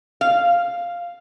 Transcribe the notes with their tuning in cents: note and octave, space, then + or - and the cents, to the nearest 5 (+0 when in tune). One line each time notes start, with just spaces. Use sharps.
F5 +0